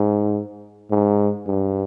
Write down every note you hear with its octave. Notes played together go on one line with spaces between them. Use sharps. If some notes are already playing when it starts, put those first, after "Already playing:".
Already playing: G#2
G#2
G2